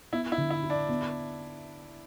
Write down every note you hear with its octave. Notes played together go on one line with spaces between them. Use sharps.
B3 E4
E4
D3
E4
E4
D4
B3